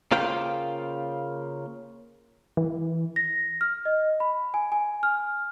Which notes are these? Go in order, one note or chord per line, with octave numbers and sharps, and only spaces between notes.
C#3 A#3 F4 C5 F5 G5
E3
A#6
F6
D#5
B5
G#5
G#5
F6